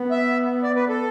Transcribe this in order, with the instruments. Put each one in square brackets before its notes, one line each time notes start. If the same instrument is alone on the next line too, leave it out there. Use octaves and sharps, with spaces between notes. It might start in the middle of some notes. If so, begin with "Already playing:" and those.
Already playing: [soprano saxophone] B3
[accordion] E5
D5
B4
A4